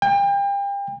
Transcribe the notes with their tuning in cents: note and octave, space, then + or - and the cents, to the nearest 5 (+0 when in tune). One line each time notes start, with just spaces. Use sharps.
G5 +35